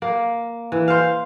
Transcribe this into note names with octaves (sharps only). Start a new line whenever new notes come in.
A#3
E3
C5 F5